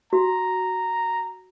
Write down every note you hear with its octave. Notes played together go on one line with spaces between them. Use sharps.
F#4 A#5